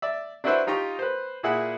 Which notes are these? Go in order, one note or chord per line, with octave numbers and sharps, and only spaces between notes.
D5 E5
D4 E4 F#4 B4 C5 E5
D#4 F4 G4 A#5 C#6
B4 C5
A#2 E4 G#4 F#5 B5